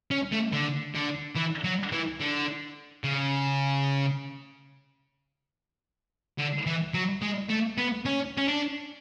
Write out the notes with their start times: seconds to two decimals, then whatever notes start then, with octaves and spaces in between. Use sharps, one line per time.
0.11 C#4
0.32 A3
0.53 D3
0.95 D3
1.36 E3
1.64 F#3
1.92 E3
2.20 D3
3.04 C#3
6.39 D3
6.67 E3
6.94 F#3
7.22 G#3
7.50 A3
7.78 B3
8.06 C#4
8.37 C#4
8.48 D4